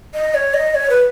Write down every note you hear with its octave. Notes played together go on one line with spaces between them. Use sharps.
D#5
C#5
D#5
C#5
B4